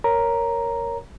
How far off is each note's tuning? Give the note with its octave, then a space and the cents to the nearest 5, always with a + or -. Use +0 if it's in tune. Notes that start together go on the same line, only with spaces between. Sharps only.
A#4 +0 C#5 +0 A#5 +0